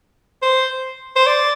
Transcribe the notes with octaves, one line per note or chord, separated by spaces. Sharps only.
C5
C5
D5